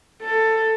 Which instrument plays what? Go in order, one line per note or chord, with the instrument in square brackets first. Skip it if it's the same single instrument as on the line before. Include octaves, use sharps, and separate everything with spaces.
[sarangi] A4